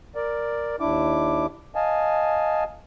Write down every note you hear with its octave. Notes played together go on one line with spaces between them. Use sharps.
A#4 D5
D#2 D4 E4 D6
D#5 F5 G#5 A5